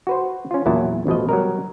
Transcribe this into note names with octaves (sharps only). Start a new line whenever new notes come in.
F#4 B4 C5
C#4 F4
E2 A#2 F#3 E4 A5
A1 B2 F3 D#5
F#3 G3 A#4